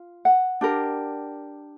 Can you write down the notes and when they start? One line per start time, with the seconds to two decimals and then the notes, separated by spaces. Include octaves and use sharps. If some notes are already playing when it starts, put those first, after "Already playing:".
Already playing: F4
0.25 F#5
0.61 D4 G4 A#4